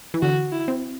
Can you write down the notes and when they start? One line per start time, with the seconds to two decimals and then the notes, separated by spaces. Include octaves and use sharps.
0.14 E3
0.22 D3 F#4
0.52 E4
0.68 C4